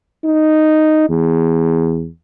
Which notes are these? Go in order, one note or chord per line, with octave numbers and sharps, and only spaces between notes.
D#4
E2